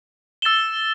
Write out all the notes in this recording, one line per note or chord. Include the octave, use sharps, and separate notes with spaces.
E6 A6 E7 G7